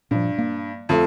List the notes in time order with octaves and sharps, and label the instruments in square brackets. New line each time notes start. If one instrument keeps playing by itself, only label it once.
[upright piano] G2 [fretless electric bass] A#2 F3
[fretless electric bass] A#3
[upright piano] F2 A3